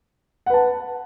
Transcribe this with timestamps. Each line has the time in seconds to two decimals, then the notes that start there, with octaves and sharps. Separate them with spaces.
0.46 F#5
0.50 B4
0.54 A5